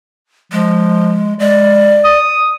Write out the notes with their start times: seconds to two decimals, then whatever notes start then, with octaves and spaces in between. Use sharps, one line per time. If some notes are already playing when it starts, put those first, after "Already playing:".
0.52 F3 G#3
1.40 G#3 D5
2.04 D#6